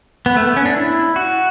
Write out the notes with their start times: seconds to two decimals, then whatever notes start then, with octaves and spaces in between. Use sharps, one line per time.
0.26 B3
0.36 A3
0.47 B3
0.57 C#4
0.66 D4
0.76 E4
1.16 F#4